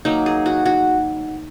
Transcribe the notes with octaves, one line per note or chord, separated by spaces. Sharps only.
D#3 F#3 A#3 D#4
G#4
F#4
F#4